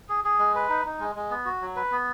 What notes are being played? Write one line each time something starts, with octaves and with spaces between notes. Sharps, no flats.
G#4
G#4
G#3
B4
D#4
D#4
G#3
G#3
B3
F#4
F#3
B4
B3